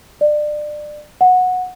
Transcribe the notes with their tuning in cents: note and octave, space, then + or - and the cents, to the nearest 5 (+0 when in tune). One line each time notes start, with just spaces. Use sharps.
D5 +25
F#5 -15